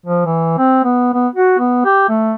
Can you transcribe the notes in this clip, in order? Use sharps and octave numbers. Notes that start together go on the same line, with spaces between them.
F3
E3
C4
B3
B3
F#4
B3
G4
A3